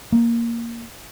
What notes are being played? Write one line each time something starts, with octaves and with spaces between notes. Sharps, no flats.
A#3